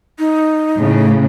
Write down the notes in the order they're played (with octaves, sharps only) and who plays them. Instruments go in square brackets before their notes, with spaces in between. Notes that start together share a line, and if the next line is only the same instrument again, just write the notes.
[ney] D#4
[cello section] A2 C#3